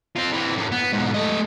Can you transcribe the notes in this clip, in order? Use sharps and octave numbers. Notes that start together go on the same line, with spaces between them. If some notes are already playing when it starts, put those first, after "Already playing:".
C4 F4
E3 C4
F#2 A2
B3
G#2 B2
A3 D#5